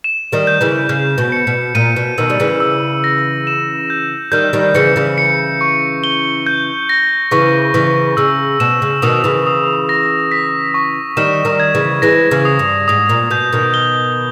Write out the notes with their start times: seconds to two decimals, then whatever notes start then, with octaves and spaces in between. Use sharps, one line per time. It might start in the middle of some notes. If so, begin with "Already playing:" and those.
0.04 E7
0.32 D#3 G3
0.47 G6
0.61 C#3 E3
0.89 C#3 G6
1.18 B2
1.32 C#7
1.47 B2
1.75 A#2 D#7
1.96 B2
2.18 B2 D#3 E6
2.30 G3
2.40 C#3 E3
2.60 E6
3.04 A#6
3.47 E7
3.90 G6
4.32 D#3 G3 G6
4.53 D#3 G3
4.74 C#3 E3 C#7
4.96 C#3 E3
5.18 C#7
5.61 C#6
6.04 G7
6.46 G6
6.89 A#6
7.31 C#3 E3 C#6
7.74 C#3 E3 C#6
8.17 C#3 E6
8.60 B2 E7
8.82 C#3
9.02 B2 D#3 D#6
9.24 C#3 E3
9.46 D#6
9.89 A#6
10.32 B6
10.74 C#6
11.17 D#3 G3 E7
11.45 D#3 G3
11.60 G#6
11.75 C#3 E3
12.02 E3 G#3 A#6
12.31 C#3 E3
12.45 D#6
12.59 G2
12.88 G#2 D#6
13.09 A#2
13.31 B2 G6
13.53 B2 D#3
13.74 G7